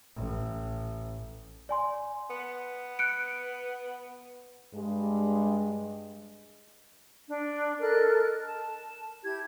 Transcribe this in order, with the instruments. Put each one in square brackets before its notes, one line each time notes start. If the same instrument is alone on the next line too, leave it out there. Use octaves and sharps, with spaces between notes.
[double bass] A1
[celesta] D5 G#5 C6
[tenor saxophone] B3
[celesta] F#6 C#7 D7
[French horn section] G2 G#3
[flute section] D4
A4 A#4 D#5 F#6
A5
E4 G4 G#6